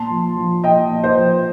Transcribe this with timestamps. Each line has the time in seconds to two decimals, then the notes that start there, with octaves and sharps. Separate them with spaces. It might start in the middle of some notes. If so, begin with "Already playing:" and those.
Already playing: A#2 A5 C6
0.10 F3
0.37 F3
0.63 A#2 D#5 G5
0.91 A#2
1.03 C5 D#5
1.17 F3